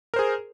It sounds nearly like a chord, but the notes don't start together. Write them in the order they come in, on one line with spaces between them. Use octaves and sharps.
A#4 C5 G#4